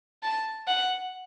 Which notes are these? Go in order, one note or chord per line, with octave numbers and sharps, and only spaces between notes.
A5
F#5